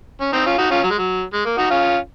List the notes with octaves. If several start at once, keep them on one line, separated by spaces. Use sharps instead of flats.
C#4
C4 D#4
C#4 F4
D#4 F#4
C#4 F4
F#3
G#3
F#3
G#3
A#3
D#4 F#4
C#4 F4